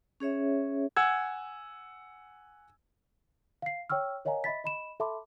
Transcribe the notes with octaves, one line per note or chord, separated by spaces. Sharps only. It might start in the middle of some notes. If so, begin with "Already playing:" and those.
C#4 G#4 C#5 E5
F#5 G#5 E6 G#6
F5 C7
C#5 G5 C#6 E6 F6
A#4 C#5 D#5 F5 G#5 A#5
D#5 E5 B5 A6 B6
D#5 B5 E7
A4 E5 A5 B5 C6 D6